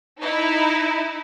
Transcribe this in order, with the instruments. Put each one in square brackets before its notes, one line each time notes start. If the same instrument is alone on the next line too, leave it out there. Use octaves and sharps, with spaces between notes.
[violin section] D#4 E4